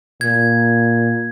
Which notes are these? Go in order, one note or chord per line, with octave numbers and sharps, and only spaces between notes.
A#2 G#6